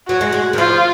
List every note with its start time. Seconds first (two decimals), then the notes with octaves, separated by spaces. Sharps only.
0.08 F#3 F#4
0.21 G#3
0.33 G#3
0.53 D#3
0.58 F3 F4